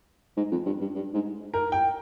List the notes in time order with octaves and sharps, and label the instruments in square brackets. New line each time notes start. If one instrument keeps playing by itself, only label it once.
[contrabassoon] G#2
F2
G2
G2
G2
G#2
[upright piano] A#4
G5